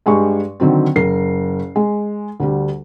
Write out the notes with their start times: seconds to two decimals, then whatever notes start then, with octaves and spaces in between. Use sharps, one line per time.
0.06 G2 G#3 G4 C#6
0.60 D3 D#3 F#3 C4
0.96 F#1 A#4 C7
1.76 G#3
2.40 D2 D3 G3